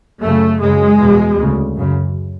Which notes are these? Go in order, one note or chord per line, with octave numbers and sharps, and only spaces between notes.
F#2 C#3 A3
F#2 C#3 G#3
E2 B2
D2 C#3
F#2 C#3